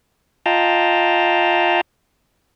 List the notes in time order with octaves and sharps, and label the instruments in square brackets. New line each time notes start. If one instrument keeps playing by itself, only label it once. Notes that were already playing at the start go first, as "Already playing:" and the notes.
[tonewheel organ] F4 D#5 F5 G5 A5 A#5